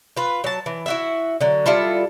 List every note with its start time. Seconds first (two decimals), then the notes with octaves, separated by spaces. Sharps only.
0.17 F4 B4
0.44 F#3 A5
0.66 E3
0.86 E4 F#4 E5
1.41 D3 F#3
1.66 G3 E4 F4 A4